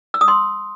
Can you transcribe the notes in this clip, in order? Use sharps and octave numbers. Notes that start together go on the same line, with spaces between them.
E6
D#6
C6